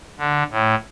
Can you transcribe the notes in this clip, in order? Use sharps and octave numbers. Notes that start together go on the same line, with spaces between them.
D3
A2